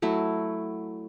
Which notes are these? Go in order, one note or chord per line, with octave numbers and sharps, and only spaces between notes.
F#3 A3 E4